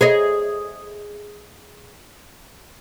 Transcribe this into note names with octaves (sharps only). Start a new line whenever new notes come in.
G#4 C#5 D#5